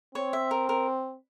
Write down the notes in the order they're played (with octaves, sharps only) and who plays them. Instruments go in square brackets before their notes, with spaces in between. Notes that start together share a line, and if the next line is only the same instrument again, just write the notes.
[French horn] C4 [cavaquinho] C#5
[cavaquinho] E5
A#4
A#4